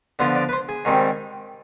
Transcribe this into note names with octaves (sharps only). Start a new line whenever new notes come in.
D3 F3 B3 D4 F4 C5
D5
B4
C5
G#4
G#2 D#3 G3 C4